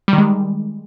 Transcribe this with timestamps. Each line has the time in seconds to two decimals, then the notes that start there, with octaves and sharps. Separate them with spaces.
0.08 G3
0.13 D#3
0.18 G#3